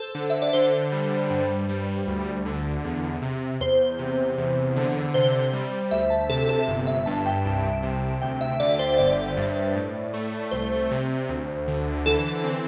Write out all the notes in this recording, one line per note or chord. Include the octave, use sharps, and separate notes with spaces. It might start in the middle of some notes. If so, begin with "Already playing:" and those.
Already playing: A4 C5
D3
E5
D5
D3 C5
G3
G2
G3
D2
D3
E2
C3
E2 C5
C3
E2
D3
C3 C5
G3
D2 E5
A5
C3 A4
A4
G1
E5
G2 A5
G5
C2
C3
D2 G5
E5
D3 D5
C5
G1 D5
G2
A2
A3
C2 C5
C3
D2
D3
E3 A4
C4